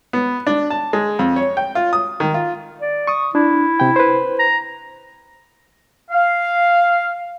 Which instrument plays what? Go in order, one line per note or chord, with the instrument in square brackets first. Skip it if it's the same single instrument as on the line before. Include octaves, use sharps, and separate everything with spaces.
[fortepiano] B3
D4
A5
G#3
F2
C#5
G5
F4
D#6
D#3
F4
[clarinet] D5
[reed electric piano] C#6 D#6
[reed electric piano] D4 [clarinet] E4
[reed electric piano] C3 G5
B4 C5
[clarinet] A#5
[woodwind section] F5